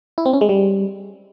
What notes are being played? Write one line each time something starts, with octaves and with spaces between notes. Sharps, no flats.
E4
C4
C#4
G#3
G3